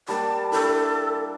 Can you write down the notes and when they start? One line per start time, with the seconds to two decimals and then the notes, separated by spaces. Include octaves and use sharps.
0.08 G3 A#3 A5
0.52 D4 E4 A4